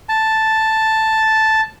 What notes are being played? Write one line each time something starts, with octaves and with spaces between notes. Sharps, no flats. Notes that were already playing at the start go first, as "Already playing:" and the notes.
A5